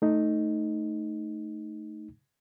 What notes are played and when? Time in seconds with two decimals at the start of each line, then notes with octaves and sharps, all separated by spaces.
0.02 A3 D#4